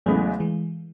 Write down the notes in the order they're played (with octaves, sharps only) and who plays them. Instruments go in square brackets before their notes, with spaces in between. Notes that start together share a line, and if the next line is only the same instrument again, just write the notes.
[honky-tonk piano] E2 C#3 G#3 B3 E4 [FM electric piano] F#3 A3
[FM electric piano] E3 G#3